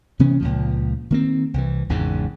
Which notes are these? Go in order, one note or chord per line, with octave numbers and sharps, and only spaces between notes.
C3 E3 B3 C#4
C#2 A#2 F3
D#3 A#3 C4
C2 E3
G#1 E2 G#2 C#3